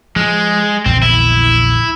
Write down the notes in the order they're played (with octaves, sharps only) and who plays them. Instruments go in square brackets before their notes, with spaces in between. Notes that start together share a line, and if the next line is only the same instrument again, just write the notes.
[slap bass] F3 [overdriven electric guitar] G#3
[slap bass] A#1 E2 D3 [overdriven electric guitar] C4
[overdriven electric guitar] E4